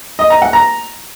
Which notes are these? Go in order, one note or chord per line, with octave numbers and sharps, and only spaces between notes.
D#5
A#5
F#5
A#5